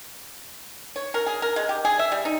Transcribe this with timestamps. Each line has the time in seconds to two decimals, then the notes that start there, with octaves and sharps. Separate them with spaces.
0.96 C#5
1.14 A#4
1.26 G#4
1.42 A#4
1.56 G#3
1.69 G4
1.85 G#4
1.99 E5
2.12 G3
2.25 D#4